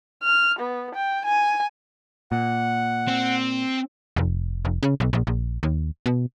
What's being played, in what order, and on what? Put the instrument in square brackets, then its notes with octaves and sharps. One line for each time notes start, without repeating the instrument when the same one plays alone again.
[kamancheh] F6
B3
G5
G#5
[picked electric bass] A#2 [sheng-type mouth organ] F#5
[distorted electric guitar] C4
[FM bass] F1
F1
C#3
B1
A#1
A#1
D#2
B2